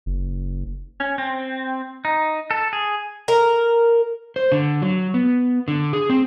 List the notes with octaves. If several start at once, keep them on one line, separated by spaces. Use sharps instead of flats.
F#1
C#4
C4
D#4
A4
G#4
A#4
C5
D3
F#3
B3
D3
G#4
C4